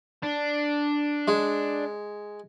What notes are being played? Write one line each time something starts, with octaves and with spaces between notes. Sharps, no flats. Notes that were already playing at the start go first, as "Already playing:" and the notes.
D4
G#3